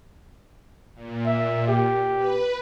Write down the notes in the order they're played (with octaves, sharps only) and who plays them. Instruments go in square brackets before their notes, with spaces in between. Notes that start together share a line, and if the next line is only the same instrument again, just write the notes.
[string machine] A#2
[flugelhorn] E5
G4
[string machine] B4